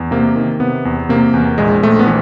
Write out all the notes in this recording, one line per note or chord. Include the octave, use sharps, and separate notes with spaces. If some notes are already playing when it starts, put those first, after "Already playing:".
Already playing: E2
C3 A#3
D#3
C3 B3
E2
C3 A#3
E2
A#1 G#3
A#1 A3
B3
E3